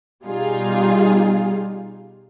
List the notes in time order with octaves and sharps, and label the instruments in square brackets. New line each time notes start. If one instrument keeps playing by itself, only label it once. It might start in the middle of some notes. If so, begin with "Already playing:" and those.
[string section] B2 G3 D#4 F4 G#4